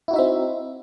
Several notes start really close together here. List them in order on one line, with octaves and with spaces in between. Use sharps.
E4 F#4 D#4 E5 C4